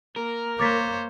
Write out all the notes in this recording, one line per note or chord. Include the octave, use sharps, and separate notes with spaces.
A#3 A#4
A#3 C5 C#5 D6 A6 B6